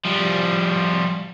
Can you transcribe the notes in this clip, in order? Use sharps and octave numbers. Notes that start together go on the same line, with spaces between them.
F3 G3